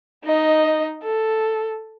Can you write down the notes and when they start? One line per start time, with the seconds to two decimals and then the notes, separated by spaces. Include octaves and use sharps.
0.25 D#4 D#5
1.03 A4